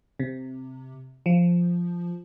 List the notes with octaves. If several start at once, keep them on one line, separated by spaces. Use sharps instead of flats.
C3
F3